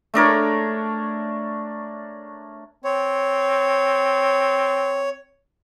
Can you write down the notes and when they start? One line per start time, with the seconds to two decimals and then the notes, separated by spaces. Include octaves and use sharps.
0.14 A3 D4 A#4 C#5
2.84 C4 C#5